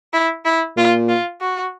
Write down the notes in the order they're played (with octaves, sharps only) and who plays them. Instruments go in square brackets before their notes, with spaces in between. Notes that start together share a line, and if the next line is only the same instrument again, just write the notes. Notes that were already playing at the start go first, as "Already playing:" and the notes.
[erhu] E4
E4
[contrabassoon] A#2 [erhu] F4
[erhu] F4
F#4